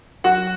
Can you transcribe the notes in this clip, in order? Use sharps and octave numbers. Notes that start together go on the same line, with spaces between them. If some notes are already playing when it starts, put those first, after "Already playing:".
F#3 F#4 F#5